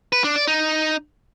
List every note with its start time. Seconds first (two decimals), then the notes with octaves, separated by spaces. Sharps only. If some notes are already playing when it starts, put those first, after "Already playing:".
0.13 B4
0.24 D4
0.36 D5
0.47 D#4